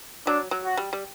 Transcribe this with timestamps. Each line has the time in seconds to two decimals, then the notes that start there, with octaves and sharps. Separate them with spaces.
0.27 F#3 D4
0.51 F#3
0.65 F#4
0.77 G3
0.93 G3